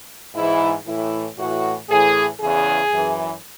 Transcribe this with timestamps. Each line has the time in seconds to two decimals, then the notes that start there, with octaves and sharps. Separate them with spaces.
0.34 G#2 E3 E4
0.85 A2 E3 E4
1.36 A2 E3 F#4
1.88 A2 E3 G#4
2.39 E2 C#3 E3 G#4
2.91 F#2 E3